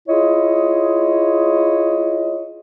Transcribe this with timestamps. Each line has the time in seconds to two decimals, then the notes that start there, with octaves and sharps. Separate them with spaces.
0.08 E4 F4 G#4 C#5 D#5